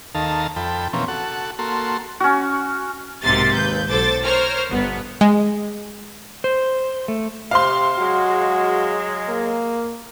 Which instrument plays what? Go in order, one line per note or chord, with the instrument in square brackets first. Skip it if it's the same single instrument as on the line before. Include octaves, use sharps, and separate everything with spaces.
[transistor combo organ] D#2 D#3 A4 F5 A5 A#5
F2 A4 G5 B5
B2 E3 F3 A#3 C4 C#4
F#4 A4 F#5
A#3 F#4 A4 C6
[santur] C#4 F#4
[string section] B1 G#2 C3 A#3 C6 A6
D#2 B4 G6
B1 A4 C5 D6 A6
A#4 C5 C#5 F6
G1 B3
[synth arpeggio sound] G#3
[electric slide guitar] C5
A3
[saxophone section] C3 [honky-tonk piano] F5 C6
[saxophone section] F#3 G#3 [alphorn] F#4
[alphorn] A#3